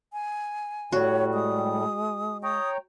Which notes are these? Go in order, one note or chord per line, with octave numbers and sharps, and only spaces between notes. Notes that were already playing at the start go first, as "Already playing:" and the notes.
G#5
A2 G3 F#4 C#5
G#3 D#6
C#5 G5 A#5 D#6